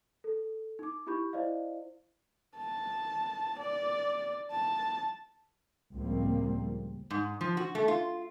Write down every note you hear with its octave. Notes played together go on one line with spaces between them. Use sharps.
A4
D#4 D6
D#4 E4 G4 B5 C#6 G6
E4 C5 D5 D#5 F5
A5
D5
A5
C#2 A2 F3 G3 A#3 C4
G#2
F3
F#4
A3
F4